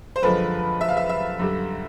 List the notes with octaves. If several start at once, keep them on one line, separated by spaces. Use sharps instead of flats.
C5
F#2 D3 F3 G#3 B4
E5
F5
E5
E5
F#2 D3 G3